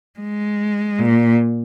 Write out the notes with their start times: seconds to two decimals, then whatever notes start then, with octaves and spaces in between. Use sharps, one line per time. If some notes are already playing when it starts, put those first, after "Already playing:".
0.19 G#3
0.99 A#2